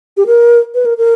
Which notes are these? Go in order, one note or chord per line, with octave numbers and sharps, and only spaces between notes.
G4
A#4
B4
A#4
A#4